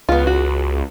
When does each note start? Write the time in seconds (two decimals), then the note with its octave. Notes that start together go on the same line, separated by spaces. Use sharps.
0.09 C#2 B3 F4
0.27 F#4